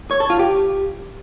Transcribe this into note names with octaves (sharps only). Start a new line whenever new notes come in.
C#5
A4
F4
G4